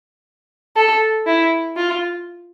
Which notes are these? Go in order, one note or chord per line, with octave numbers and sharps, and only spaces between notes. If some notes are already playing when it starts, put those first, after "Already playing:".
A4
E4
F4